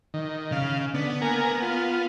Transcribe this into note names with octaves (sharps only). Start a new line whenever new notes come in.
D#3
C#3 F5
D3 B3
A#3 A#4 G#5
F4